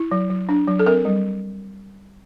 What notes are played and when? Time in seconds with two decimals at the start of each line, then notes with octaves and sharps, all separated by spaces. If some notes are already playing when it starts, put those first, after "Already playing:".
Already playing: E4
0.11 F#3
0.30 F#3
0.49 D4
0.68 F#3
0.79 A4
0.86 C4 A#4
1.05 G3